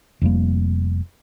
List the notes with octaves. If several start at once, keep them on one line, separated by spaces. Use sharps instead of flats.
F1 F2 G3 A#3